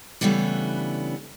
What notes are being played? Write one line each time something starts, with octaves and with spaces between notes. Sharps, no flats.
C#3 E3 G3 A3 B3 D4